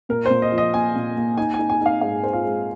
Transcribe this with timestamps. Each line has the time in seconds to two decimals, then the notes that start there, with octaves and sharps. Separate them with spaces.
0.09 A#2 A#4
0.26 A#2 C5
0.42 D#5
0.52 F3
0.58 D#5
0.74 A#3 G#5
0.96 A#2
1.17 A#3
1.37 D#4 G#5
1.54 G#5
1.59 D#4
1.70 G#5
1.81 D#4 F5
2.01 G#2 F5
2.24 C5
2.33 F4
2.44 G#3